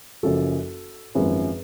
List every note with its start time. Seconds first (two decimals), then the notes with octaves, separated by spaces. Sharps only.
0.23 F#1 F#2 F3 F#4 A4
1.15 G#1 F#2 F3 G#4 B4